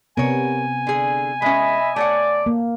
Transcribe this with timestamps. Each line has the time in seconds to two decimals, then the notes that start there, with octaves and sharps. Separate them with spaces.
0.17 C3 B3 A#4 C#5 G#5
0.87 D3 G#4
1.42 G#3 C#4 D#5 E5 B5
1.96 A3 C#5 D5 F#5 D6
2.46 A#3